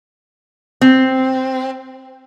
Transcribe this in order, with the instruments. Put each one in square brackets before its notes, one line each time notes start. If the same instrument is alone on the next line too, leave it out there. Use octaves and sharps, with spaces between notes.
[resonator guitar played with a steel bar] C4